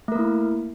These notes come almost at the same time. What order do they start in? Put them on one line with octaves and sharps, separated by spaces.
A3 A#4 A#3 E4